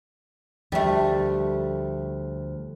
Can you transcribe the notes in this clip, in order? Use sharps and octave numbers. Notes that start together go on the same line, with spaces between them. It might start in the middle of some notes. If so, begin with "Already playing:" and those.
D2 F3 G3 A3